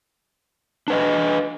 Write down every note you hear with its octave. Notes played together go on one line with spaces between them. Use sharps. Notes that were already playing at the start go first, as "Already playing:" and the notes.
D4 B4 D#5